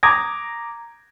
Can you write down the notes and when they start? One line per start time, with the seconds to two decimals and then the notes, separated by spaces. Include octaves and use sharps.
0.03 A#5 D6 D#6 G#6 A#6